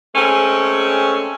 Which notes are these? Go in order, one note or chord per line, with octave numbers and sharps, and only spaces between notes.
G#3 A3 C4 C#4